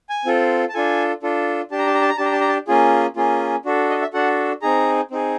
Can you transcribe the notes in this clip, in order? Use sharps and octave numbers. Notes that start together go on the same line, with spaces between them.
G#5
C4 F4 A4
A5
D4 F4 A4 G#5
D4 F4 A4
D4 G4 A5
A#5
A5
A#5
A5
A#5
D4 G4 A5
A#5
A5
A#5
A5
A#3 C#4 F4 G#4
A#3 C#4 F4 G#4
D4 F#4 A4
D#5
E5
D4 F#4 A4 F#5
C4 D#4 G#4 A#5
C4 D#4 G#4